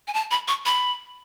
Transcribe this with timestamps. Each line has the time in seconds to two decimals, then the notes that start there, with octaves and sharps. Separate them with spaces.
0.08 G#5
0.14 A5
0.31 B5
0.48 C#6
0.66 B5